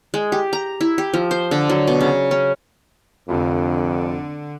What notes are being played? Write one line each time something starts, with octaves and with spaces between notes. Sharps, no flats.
G#3
G4
A#5
E4
G4
F3
C5
D3
F#3
B2
C#3
C#4
F1 F2 D3 F4 B5